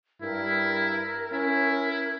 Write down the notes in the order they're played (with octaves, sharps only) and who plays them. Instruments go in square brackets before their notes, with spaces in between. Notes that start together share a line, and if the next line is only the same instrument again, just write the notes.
[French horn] G2 [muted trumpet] E4 [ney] A#4
[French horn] C#4 [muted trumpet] E4